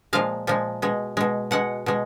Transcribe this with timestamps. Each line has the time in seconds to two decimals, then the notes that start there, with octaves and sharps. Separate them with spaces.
0.13 A#2 F3 G#3 F5
0.47 A#2 F3 G#3
0.82 B2 G#3
1.17 B2 G#3
1.51 B2 G#3 F#5
1.86 B2 G#3